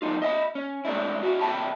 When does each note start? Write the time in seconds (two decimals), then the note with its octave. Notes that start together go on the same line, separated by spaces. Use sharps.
0.02 F#3 B3 D#4 F4
0.22 D#5 E5 F#5 B5
0.55 C#4
0.85 G#3 A3 C4 D4 E4
1.23 E4 F#4 E5
1.41 C2 C3 E5 G5 A5 B5